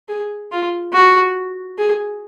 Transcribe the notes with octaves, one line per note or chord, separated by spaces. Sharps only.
G#4
F4
F#4
G#4